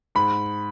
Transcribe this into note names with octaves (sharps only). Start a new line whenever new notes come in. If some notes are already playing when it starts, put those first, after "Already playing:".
G#2 B5